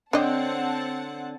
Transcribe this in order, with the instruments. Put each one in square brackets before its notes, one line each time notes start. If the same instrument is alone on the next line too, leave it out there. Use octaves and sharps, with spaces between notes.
[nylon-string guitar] D3 C#5 G5 [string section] C4 F#5 A5 [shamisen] D4 D#5